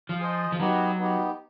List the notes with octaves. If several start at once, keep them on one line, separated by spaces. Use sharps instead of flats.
F3
G#4 C5 D#5
F3
F#3 B3 D#4 G4
B3 D#4 G4